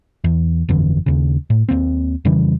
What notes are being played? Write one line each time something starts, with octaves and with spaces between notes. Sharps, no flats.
E2
G1 F2 D3 E3
D#2 C#3
A2
D#2 A#2 A#3 C4
F2 C#3 E3 G3